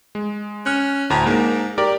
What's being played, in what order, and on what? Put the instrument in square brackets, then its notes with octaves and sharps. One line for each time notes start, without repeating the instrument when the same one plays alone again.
[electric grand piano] G#3
[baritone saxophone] C#4 [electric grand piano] F6 F#6
[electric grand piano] D2 A#5 [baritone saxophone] A2
[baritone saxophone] G#2 [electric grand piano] A#3 A#4
[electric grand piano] G4 A#4 D5